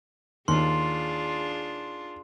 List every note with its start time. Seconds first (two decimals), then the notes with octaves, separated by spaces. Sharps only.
0.48 D#2 D4 F4 G#4 C6